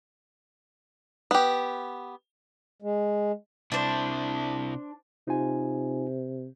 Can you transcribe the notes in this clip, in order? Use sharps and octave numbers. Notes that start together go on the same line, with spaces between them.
B3 G4
G#3
C3 D4 E4 C5
C3 D#4 F4 G#5